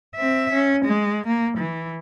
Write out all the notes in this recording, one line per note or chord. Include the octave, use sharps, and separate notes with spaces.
C4 E5
C#4
G#3
A#3
E3